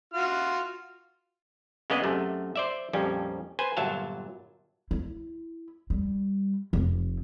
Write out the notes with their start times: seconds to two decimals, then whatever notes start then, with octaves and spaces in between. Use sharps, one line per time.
0.14 F4 F#4 F6
1.90 C#3 G#3 A#3 B3 D5 D#5
2.04 F#2 C3 A3
2.56 C5 D5 E5
2.93 A#1 F2 F3 G3 C#4
3.59 B4 C5 G#5
3.77 G1 A#2 F#3 E5 F5 A5
4.91 E4
5.90 G3
6.73 F1